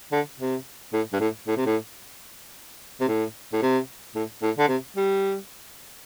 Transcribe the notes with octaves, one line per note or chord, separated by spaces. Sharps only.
D3
C3
A2
G2
A2
A2
C3
A2
C3
A2
A2
C3
A2
A2
D3
C3
G3